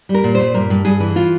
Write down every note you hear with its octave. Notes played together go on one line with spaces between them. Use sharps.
G3
A#4
A#2
A#2 C5
G2 A#4
G2
G2 G#4
E3
F4